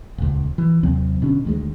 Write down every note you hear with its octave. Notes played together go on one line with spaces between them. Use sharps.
D#1 C#2
E3
D#2 C3 F#3 C4
B2 D3 C#4
D2 D#3 G#3